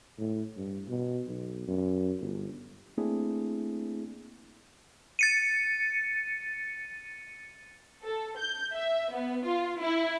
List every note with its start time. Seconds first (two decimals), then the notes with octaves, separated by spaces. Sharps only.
0.18 A2
0.57 G2
0.88 B2
1.27 B1
1.68 F#2
2.20 G1
2.98 A3 A#3 C4 D4 E4 G#4
5.19 A6 C#7 D#7
8.04 A4
8.38 G6
8.73 E5
9.13 B3
9.45 F4
9.81 E4